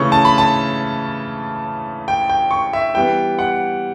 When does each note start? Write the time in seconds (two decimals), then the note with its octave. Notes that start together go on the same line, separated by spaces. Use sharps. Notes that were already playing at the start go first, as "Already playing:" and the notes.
Already playing: C#3 E3 A3 C#4 C#6
0.12 A5
0.25 B5
0.38 A5
2.08 G5
2.29 G5
2.51 C#6
2.73 E5
2.94 E3 G3 B3 G5
3.39 F#5